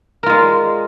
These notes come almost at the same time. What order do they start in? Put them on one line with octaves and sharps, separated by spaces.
A#4 F4 G#3